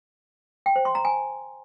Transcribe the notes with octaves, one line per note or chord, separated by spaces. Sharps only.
G5
C5
C6
A#5
G#5